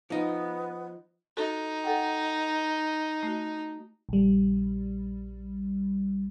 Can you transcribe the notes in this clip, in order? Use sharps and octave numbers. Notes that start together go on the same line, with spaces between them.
F3 B3 D#4
D#4 F#4 A4
A4 F#5 G5
A3 F#4
A#1 G3